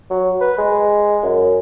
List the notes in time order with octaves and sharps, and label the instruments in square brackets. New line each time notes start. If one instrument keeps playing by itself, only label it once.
[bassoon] F#3
B4
G#3
F#2